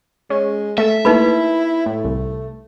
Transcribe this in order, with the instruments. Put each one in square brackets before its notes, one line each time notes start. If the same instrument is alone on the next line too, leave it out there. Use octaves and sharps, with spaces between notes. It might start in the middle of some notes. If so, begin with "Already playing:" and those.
[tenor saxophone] G#3 [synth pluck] C#4
[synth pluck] A3 A4 [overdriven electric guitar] E5
[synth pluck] A3 A#3 [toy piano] D#4 B4 B5 [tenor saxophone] E4
[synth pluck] A2 [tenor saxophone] A3
[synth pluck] C2